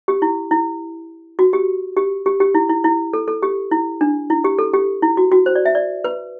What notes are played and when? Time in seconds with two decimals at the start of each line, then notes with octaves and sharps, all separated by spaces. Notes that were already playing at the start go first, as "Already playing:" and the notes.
0.08 G4
0.22 E4
0.51 E4
1.39 F#4
1.53 G4
1.97 G4
2.26 G4
2.40 G4
2.55 E4
2.69 E4
2.84 E4
3.13 A4
3.28 A4
3.43 G4
3.71 E4
4.01 D4
4.30 E4
4.44 G4
4.59 A4
4.73 G4
5.02 E4
5.17 F#4
5.32 F#4
5.46 C5
5.55 D5
5.65 E5
5.75 D5
6.04 B4